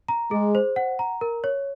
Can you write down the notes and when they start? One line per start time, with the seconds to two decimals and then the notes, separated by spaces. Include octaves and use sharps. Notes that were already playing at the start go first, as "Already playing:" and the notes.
0.08 A#5
0.31 G#3 G#4
0.55 C5
0.76 F#5
0.99 A#5
1.21 A#4
1.44 C#5